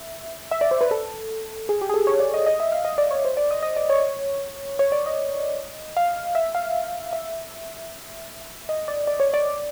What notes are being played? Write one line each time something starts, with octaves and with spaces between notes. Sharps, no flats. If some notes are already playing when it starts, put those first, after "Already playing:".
Already playing: E5
E5
D5
C5
B4
A4
G#4
G4
G#4
A4
C#5
D5
D#5
D#5
E5
F5
D#5
D5
C#5
C5
D5
D#5
D#5
D5
C#5
C#5
D5
D#5
F5
E5
F5
E5
D#5
D5
D5
C#5
D5